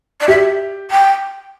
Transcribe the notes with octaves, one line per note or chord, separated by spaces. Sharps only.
D5
G4 E5
G5